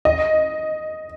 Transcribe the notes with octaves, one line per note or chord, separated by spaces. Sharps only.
D#5